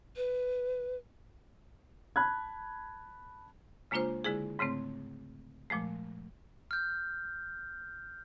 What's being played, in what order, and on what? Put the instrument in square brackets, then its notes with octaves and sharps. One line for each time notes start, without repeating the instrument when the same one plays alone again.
[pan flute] B4
[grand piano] A5 B5 F#6 G#6
[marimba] C#3 G#3 A#3 D4 F4 C5
D3 G#3 E4 G#4
G#2 C#3 A3 C4
A#2 F3 G#3 A3
[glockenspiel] F6 G6